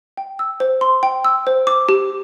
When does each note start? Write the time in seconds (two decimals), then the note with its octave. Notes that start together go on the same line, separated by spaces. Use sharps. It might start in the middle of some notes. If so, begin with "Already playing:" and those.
0.17 G5
0.39 E6
0.60 C5
0.81 C6
1.03 G5
1.25 E6
1.47 C5
1.67 D6
1.89 G4